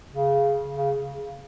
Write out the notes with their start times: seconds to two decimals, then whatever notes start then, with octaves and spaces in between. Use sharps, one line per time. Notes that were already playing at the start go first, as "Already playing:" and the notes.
0.12 C#3
0.75 C#3